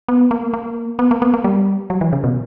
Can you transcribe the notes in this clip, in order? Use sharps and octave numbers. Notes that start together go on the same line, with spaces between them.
B3
A#3
A#3
B3
A#3
B3
A#3
G3
F#3
E3
C#3
B2